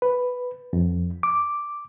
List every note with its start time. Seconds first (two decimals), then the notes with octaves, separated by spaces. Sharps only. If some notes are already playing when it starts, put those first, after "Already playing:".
0.02 B4
0.73 F2
1.23 D6